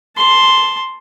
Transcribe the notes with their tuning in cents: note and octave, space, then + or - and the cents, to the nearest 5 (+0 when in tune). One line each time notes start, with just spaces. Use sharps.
A5 +0 C6 +0